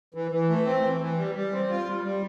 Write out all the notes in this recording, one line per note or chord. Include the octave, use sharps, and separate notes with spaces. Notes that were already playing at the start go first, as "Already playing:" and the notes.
E3
E3
A3
C4
E3
E3
G3
G3
C4
F4
G3
G3